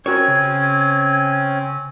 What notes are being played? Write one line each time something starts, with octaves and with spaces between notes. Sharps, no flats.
C4 C#4 F#4 A#4 C#5 G#6
C#3